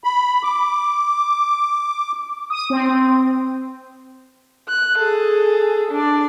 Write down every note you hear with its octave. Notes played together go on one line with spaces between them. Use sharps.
B5
D6
D#6
C4
F#6
G#4 A4
D4 D5